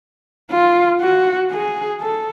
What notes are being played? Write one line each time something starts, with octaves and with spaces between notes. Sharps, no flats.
F4
F#4
G#4
A4